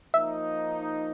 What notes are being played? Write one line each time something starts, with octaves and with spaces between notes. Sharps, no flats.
F3 A#3 D#4 E5